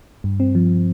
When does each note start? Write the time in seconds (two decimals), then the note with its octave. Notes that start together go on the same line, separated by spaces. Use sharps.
0.24 G2
0.40 C4
0.55 F3